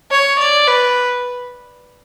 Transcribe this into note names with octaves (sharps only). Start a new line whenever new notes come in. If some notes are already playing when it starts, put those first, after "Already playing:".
C#5
D5
B4